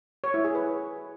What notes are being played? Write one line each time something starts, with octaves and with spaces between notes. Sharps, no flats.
C#5
E4
G#4
B4